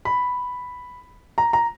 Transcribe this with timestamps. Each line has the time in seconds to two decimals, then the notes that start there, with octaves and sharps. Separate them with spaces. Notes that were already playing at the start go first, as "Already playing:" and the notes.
0.05 B5
1.38 A#5
1.53 A#5